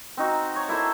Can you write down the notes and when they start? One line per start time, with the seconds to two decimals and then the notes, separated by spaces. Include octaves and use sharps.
0.17 C4 D#4 F#4
0.56 C#5 A#5
0.68 A#3 E4 A4 C5